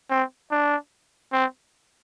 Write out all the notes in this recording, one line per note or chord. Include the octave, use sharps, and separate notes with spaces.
C4
D4
C4